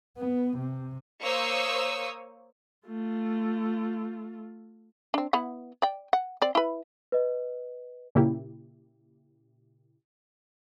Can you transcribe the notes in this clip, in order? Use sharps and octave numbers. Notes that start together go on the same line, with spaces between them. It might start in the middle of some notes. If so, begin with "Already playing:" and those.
B3
C3
A#3 C5 C#5 C#6 D#6 E6
A3 F4
C4 D4
B3 E4 F#5
D5 G5
F#5
C4 D5
E4 B4
B4 D#5
A#2 C#3 A#3 E4 G4